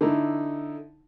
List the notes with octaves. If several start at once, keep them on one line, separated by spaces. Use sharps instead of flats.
D3 D#4 E4